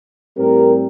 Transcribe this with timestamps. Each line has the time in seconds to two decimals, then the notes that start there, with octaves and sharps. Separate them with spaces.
0.37 A2 G3 C4 G4 A#4